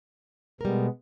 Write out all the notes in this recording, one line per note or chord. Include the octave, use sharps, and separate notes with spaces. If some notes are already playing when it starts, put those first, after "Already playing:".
B2 G3 G#3 B3 A#4